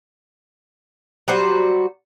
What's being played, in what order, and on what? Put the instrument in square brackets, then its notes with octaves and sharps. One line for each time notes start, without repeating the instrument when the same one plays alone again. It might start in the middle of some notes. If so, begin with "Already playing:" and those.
[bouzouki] F#3 G3 F#4 C5